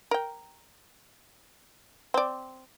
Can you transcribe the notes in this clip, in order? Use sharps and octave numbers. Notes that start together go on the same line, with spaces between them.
A#4 G5
C4 D5